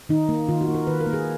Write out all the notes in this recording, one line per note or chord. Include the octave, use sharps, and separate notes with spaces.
D#3 D#4
A#3
D#3 F4
F#4
A#3
A#4
D#3 B4
A#4
A#3
G#4